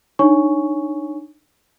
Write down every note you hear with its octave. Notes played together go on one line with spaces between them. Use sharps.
D4 D#4 C#5 G#5 C#6